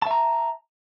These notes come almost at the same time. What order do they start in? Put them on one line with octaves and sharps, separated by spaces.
A5 E5 A#5